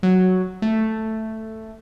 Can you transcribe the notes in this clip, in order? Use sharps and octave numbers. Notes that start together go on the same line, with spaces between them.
F#3
A3